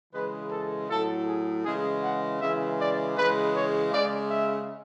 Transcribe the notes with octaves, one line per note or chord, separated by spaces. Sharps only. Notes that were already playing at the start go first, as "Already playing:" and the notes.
C#3 E3 G#3 B4
A4
A2 F#3 A4
G#4
C#3 E3 G#3 G#4
F#5
C#3 E3 G#3 E5
D5
C#3 E3 G#3 B4
C#5
C#3 G#3 D5
E5